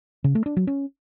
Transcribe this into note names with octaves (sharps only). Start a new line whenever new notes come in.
C#3
A3
D4
F#3
C#4